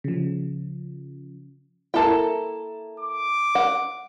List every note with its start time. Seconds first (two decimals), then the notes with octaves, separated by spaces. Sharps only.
0.04 C#3 F3
1.94 A#3 E4 A4 G5 A5
3.00 D6
3.55 F#5